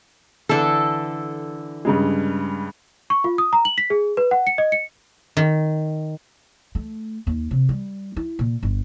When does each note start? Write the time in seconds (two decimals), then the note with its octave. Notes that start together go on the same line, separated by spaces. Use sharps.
0.49 D3 E3 A4
1.85 G2 C#3 G#3
3.10 C#6
3.24 F4
3.38 D#6
3.53 A#5
3.65 F#7
3.78 B6
3.90 G#4
4.17 B4
4.31 F#5
4.47 C#7
4.58 D#5
4.72 C#7
5.37 D#3
6.75 A3
7.27 D#2
7.51 C3
7.69 G3
8.17 E4
8.39 A#2
8.63 G1